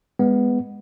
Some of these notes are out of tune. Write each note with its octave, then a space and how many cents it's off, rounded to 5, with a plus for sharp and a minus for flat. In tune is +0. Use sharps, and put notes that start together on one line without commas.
G#3 -20 B3 +0